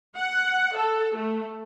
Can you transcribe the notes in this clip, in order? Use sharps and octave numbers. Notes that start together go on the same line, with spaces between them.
F#5
A4
A3